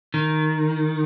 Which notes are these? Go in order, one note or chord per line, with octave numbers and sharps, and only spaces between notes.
D#3